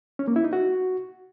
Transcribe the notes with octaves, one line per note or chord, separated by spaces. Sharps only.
C#4
A#3
E4
D#4
F#4